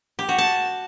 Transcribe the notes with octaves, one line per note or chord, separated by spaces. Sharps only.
G4
F#4
A5